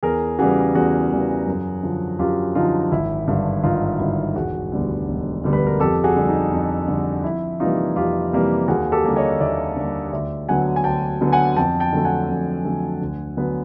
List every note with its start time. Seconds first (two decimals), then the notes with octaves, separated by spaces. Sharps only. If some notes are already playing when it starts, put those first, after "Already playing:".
0.03 E2 G#4 A#4
0.39 C#3 E3 G3 F#4 G#4
0.75 E2 F#4 G#4
1.11 C#3 E3 G3
1.47 F#2
1.83 D3 F3
2.19 F#2 F4 G4
2.55 D3 F3 D#4 F4
2.92 G#1 E4
3.28 G2 D3
3.64 G#1 D#4 F4
3.99 G2 D3 E4 F#4
4.36 E1 F#4 G#4
4.72 D2 D3 G3 B3
5.08 E1
5.44 D2 D3 G3 B3
5.53 B4
5.67 A#4
5.80 F2 G4 A4
6.04 F#4 G#4
6.16 D3 G3
6.28 D#4
6.52 F2
6.88 D3 G3
7.24 F2 E4
7.60 C3 E3 G3 A#3 D#4 F4
7.96 F2 F4 G4
8.33 C3 E3 G3 A#3
8.68 D#2 F#4 G#4
8.92 G4 A4
9.04 D3 G3 A#3
9.16 C#5 D#5
9.40 D#2 D5 E5
9.76 D3 G3 A#3
10.12 D2 D5 E5
10.49 D3 F#3 B3 F#5 G#5
10.76 G#5
10.84 D2 G5 A5
11.21 D3 F#3 B3
11.33 F#5 G#5
11.57 F2 G5 A5
11.80 G5 A5
11.93 D3 F#3 A3
12.05 F#5 G#5
12.28 F2
12.65 D3 F#3 A3
13.01 D2
13.37 D3 F#3 B3